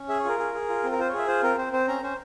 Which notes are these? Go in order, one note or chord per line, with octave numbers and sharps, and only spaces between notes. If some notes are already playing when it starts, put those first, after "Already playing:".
Already playing: C#4
G#4 E5
C#5
F4 A#4
G#4
G#4
F4
C4
A#4
F4 C5
C#5
G#4 E5
F4 C5
C4 A#4
C4 C5
C4 C5
C#4 A#5
C#4 C5